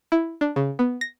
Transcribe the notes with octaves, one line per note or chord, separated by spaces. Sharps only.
E4
D4
C#3
B3
A#6